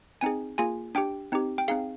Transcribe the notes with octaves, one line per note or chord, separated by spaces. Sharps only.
C4 D#4 G#4 G#5
A#3 F4 G#4 G#5
D4 G4 G5
C4 D#4 G4
G5
C4 D#4 G#4 F5